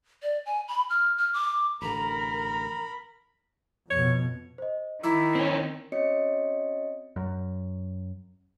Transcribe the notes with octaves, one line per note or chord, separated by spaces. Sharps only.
D5
G#5
B5
F6
F6
D6
A1 D3 A#4 A#5 B5
F2 B2 C#5
C5 D#5
D#3 E4 A#5 D6 E6
C4 C#4
C4 C#4 F#4 C#5 D#5 C#7
F#2